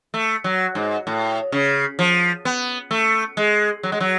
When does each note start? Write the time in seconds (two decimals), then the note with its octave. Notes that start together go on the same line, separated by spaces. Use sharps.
0.14 A3
0.44 F#3
0.75 G#2
1.07 A2
1.52 C#3
1.99 F3
2.45 B3
2.91 A3
3.37 G#3
3.83 F#3
3.92 G#3
4.00 F#3